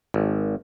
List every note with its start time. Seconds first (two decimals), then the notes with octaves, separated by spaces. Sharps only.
0.14 G#1